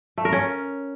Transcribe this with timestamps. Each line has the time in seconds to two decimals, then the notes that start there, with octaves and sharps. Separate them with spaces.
0.18 A3
0.25 A#4
0.32 C#4